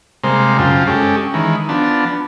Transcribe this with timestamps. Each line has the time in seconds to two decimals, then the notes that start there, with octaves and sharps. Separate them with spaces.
0.24 C3 G3 G#3 A#3 C5
0.58 F#2 C#3 F4 G5 A5
0.87 G#3 C#4 G4 A4
1.34 D#3 E3 G#3
1.69 F3 B3 D4 A5